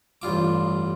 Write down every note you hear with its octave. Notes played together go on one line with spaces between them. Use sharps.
A1 G2 F4 D6